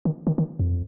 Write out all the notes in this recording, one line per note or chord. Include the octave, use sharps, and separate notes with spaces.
D#3
D#3
D#3
F2